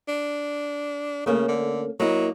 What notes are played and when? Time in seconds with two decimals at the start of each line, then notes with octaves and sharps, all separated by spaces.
0.08 D4
1.26 C#3 A3 A#3 C#4
1.48 D3
2.00 F#3 A#3 E4 D#5